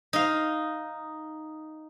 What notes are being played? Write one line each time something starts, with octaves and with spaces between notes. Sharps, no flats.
D#4 F5